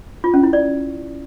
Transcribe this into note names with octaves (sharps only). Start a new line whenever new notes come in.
F4
C#4
E4
D5